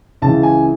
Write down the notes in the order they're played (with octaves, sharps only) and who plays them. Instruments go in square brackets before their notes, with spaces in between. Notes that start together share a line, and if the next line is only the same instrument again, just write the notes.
[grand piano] C#2 C#3 E3 A5
G#5